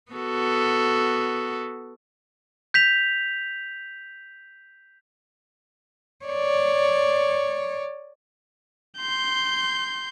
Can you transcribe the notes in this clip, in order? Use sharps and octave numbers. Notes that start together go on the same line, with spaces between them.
B3 F#4 A4
G6 B6 F7
C#5 D5
C6 G6